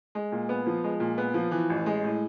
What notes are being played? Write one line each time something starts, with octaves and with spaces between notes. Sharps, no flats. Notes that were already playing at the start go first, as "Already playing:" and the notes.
G#3
A#2
B3
F3
G#3
A#2
B3
F3
E3
A1
G#3
A2